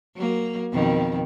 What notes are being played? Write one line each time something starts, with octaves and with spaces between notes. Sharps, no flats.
F#3 A#3
F2 B2 D#3